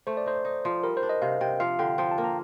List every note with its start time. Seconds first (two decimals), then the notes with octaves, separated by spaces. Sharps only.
0.07 A3 C5
0.17 D5
0.26 D#4 C5
0.45 D#4
0.65 F3
0.83 G3 A#4
0.97 C5
1.03 D4
1.09 D#5
1.22 C3 F5
1.41 C3 G5
1.60 F3 F5
1.79 D3 G5
1.98 F3 G5
2.11 A5
2.18 A#3
2.24 A#5